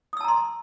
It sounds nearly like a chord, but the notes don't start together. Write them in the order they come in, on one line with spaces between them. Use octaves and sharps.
D#6 E6 A5 A#5 C6